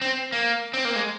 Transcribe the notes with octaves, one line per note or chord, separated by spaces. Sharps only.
C4
A#3
C4
A#3
G#3